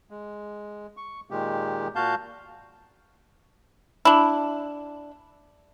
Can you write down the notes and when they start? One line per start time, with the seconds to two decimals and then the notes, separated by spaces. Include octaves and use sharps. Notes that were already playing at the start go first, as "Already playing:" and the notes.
0.10 G#3
0.97 C#6
1.31 A#2 D#3 G#3 G4
1.96 A#2 F#4 F5 A5 G6
4.05 D4 E4